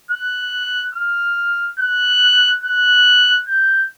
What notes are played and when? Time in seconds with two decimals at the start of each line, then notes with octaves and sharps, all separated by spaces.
0.11 F#6
0.95 F6
1.80 F#6
2.64 F#6
3.48 G6